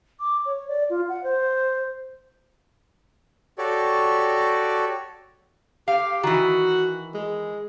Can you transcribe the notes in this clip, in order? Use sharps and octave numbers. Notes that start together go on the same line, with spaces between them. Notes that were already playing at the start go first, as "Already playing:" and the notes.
D6
C#5
D5
F4
F#5
C5
F#4 G4 A4 C#5 D5
G4 F5
D#3 E3 F#4
G#3